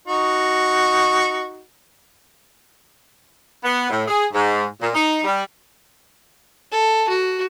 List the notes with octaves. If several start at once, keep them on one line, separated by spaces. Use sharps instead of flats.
D#4 F#4
B3
A2
G#4
G#2
A#2
D#4
G3
A4
F#4